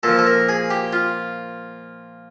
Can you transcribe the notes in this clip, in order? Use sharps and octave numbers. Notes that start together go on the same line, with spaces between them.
A#2 F3 A4
A4
A#4
G#4
G4
F4